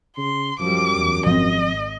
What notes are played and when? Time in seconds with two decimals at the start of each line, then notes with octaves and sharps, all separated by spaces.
0.17 C#3 C6
0.60 F#2 F3 G3 D6
0.98 E2
1.27 G#1 F3 C4 D#5